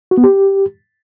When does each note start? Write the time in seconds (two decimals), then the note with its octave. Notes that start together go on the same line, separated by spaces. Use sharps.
0.11 F#4
0.17 B3
0.24 G4